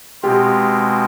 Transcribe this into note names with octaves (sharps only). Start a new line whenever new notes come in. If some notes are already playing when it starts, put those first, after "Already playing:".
B2 G#3 C4 F4 G4